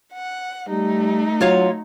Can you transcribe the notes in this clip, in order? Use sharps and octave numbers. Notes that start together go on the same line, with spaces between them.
F#5
G3 A3 D#4
F#3 F4 C#5 F5